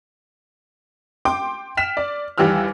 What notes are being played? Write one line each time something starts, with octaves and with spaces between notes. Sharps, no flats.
G5 C6 D6
G5 F6 B6 E7
D5
D#2 E3 G3 G4 E6 F6